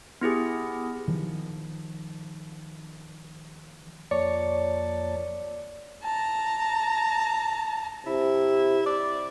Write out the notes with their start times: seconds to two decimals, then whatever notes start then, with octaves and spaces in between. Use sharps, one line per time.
0.21 B3 E4 G4 G#4
1.08 D#3 F3
4.11 F2 A#3 C#5 D5 A5
6.03 A5 A#5
8.06 C3 E4
8.86 D5